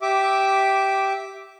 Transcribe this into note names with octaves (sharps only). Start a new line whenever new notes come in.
G4 E5 D6